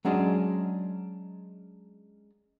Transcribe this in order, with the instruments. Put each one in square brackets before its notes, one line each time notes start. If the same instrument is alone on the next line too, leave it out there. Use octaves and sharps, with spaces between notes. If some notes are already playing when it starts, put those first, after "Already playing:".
[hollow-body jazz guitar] F#3 G#3 C#4 D4 G#4 D#5